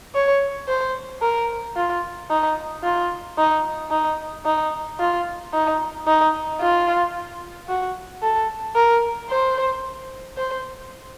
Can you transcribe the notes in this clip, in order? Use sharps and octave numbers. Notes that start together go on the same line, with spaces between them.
C#5
C5
A#4
F4
D#4
F4
D#4
D#4
D#4
F4
D#4
D#4
F4
F#4
A4
A#4
C5
C5